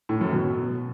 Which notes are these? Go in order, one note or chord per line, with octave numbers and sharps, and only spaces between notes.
A2
F#2
B2